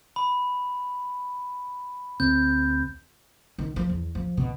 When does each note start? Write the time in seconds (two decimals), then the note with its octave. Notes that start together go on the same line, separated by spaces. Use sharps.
0.16 B5
2.20 D2 C4 G6
3.58 D#3
3.76 F3
3.89 E2
4.15 F3
4.37 B2